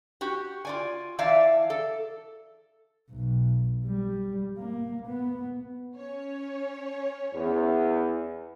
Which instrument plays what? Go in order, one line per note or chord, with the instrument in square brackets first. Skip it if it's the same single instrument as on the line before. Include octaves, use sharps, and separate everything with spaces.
[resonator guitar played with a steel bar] F#4 G4
F4 D5 G#5
E3 D5 E5 F5 A5
A4
[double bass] B1
G3
A#3
B3
[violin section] C#4 C#5
[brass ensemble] E2